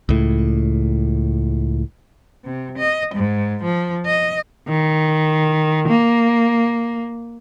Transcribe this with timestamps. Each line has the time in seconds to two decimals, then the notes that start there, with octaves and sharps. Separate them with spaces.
0.09 C#2 A2
2.44 C3
2.78 D#5
3.15 G#2
3.63 F3
4.06 D#5
4.68 D#3
5.88 A#3